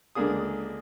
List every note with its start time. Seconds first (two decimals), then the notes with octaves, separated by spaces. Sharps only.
0.15 C#2 D3 A#3 D4 G#4 D#6